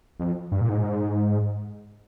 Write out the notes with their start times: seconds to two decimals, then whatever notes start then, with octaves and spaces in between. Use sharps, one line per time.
0.20 F2
0.52 G2
0.61 A#2
0.69 G#2